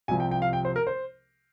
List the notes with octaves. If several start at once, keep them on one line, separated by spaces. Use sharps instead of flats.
C2 C3 F3 G#5
G5
G5
F5
G5
C5
A#4
C5